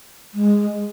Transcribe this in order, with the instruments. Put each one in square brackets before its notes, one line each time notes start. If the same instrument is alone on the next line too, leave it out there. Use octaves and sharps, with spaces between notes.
[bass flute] G#3